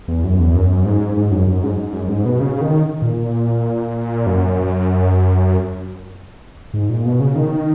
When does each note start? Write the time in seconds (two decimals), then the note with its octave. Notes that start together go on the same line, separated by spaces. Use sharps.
0.08 E2
0.24 F#2
0.39 E2
0.55 F#2
0.85 G#2
1.17 G#2
1.31 F#2
1.47 F#2
1.63 G#2
1.78 G#2
1.93 F#2
2.09 G#2
2.25 B2
2.40 C#3
2.61 D#3
3.02 A#2
4.27 F#2
6.74 G#2
6.89 A#2
7.06 B2
7.20 C#3
7.35 D#3